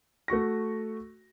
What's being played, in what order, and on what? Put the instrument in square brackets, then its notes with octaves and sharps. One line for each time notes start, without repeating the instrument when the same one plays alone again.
[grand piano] A3 F#4 C#6 A#6